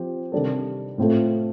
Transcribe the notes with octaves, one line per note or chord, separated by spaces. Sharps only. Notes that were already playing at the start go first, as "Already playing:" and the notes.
Already playing: F3 C4 G4
C3 D#3 G3 D4 A4
A2 A3 C4 F4 A4